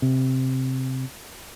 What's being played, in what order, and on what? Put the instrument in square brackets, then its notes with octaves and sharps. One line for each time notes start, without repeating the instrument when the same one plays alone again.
[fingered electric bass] C3